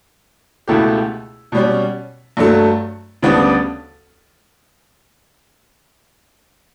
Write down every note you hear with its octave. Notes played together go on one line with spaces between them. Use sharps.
C#2 B2 A3 E4 G4
B2 G3 C#4
G2 F#3 A3
D2 C#3 G3 B3 D4